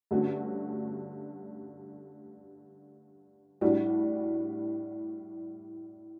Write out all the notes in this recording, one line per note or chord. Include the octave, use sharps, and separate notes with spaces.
G2 D3 A3 C#4 F#4
A2 G3 D4 F#4